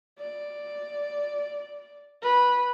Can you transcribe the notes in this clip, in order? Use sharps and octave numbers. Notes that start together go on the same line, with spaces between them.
D5
B4